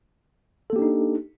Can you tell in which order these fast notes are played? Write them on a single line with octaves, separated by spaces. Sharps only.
A4 A#3 G4 D4 D#4